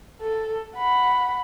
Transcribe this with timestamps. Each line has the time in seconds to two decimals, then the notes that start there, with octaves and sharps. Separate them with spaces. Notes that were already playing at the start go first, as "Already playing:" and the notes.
0.21 A4
0.75 F#5 B5